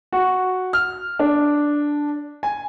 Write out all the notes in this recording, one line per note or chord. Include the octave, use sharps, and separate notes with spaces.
F#4
F6
D4
G#5